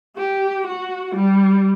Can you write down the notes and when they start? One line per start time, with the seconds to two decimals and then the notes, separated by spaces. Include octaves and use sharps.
0.17 G4
0.67 F#4
1.17 G3